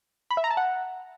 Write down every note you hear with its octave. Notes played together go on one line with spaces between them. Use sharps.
B5
E5
A#5
A5
F#5